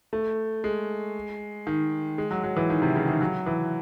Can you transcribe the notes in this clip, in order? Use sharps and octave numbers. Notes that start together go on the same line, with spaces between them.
A3
G#3
D#3
G#3
F#3
F#3
E3
D#3
C3
C#3
D#3
F#3
E3